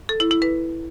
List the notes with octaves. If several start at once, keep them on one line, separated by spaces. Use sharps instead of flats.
A4
E4
E4
B4